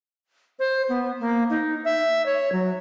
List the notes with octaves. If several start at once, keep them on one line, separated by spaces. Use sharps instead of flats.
C5
B3
A#3
D#4
E5
C#5
F#3